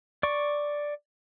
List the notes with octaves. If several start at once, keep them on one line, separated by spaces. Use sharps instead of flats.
D5 C#6